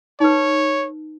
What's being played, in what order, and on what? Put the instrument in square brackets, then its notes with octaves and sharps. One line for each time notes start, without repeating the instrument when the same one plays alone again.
[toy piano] D#4 B4 [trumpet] C#5